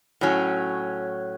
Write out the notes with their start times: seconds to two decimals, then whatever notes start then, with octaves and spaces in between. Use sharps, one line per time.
0.21 A2 F#3 C#4